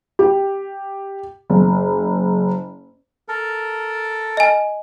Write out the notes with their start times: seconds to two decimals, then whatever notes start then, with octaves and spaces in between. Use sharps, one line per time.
0.19 G4
1.50 F#1
3.28 A4 A#4
4.37 D#5 G#5